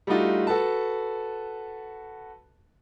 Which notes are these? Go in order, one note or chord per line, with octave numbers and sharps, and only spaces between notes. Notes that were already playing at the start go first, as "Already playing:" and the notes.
G3 A3 D4 D#4 F4 F#4
F#4 A4 B4 A5